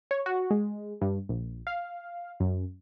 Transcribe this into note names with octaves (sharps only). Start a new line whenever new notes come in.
C#5
F#4
G#3
G2
A#1
F5
F#2